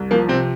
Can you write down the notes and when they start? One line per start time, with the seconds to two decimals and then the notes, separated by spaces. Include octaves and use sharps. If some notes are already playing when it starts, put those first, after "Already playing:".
Already playing: C2
0.11 F3 A#3
0.28 C3 C4